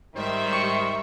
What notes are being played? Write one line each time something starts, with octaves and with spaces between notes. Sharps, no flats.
G#2 D#3 G3 C5 E5
C#6